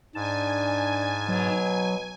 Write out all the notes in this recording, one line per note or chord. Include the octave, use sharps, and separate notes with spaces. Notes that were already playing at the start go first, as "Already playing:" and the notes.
G#2 D4 G#5 A5
B2 F#3